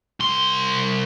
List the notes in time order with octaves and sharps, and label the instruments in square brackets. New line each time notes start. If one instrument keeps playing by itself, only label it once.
[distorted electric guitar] C2 C6